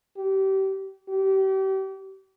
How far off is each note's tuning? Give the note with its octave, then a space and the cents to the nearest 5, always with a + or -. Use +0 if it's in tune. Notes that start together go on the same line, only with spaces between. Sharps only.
G4 -30
G4 -35